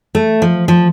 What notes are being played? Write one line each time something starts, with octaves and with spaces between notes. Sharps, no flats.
A3
F3
F3